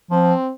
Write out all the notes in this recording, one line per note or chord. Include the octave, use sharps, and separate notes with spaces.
F3 C4